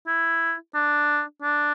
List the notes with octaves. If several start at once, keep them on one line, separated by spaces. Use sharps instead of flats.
E4
D4
D4